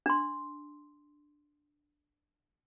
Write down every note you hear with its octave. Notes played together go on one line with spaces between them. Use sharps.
D4 C6